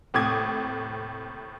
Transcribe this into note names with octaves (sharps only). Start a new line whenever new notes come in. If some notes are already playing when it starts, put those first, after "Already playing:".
D#2 A2 C3 D6 D#6 G#6